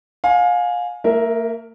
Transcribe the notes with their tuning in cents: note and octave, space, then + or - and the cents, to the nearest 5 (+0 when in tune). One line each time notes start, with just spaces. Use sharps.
F5 +30 G#5 +5
A#3 -45 A#4 +5 E5 +0